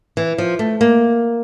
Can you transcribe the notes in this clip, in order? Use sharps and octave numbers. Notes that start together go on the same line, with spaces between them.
E3
F3
A3
A#3